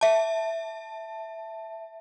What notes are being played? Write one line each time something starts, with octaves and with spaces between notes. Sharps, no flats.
E5 A5